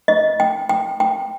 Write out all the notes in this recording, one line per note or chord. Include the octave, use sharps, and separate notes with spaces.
D#5
G5
G5
G5